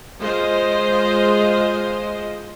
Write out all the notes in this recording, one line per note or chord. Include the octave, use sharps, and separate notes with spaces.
G#3 F4 C5 D#5